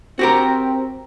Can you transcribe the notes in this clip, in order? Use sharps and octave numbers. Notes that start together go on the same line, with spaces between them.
C4 F#4 G4 A#4